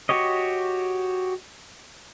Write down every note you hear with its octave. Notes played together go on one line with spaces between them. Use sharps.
F#4 G4 C#5 D#5